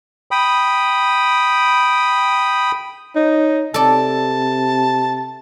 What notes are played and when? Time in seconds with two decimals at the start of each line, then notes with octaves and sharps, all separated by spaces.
0.31 G5 B5 D#6
3.15 D#4 C#5
3.74 C3 A4 D5 A5